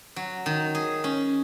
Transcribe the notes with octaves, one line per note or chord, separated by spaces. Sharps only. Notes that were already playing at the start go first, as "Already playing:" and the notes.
F#3
D#3
G#4
C#4